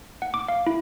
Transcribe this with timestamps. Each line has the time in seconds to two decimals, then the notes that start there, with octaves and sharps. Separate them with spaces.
0.22 F#5
0.34 D6
0.48 F5
0.67 E4